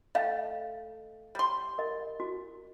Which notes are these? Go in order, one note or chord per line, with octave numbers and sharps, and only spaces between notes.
A3 D#5 F5 G5
G3 C6
A#4 D#5
F#4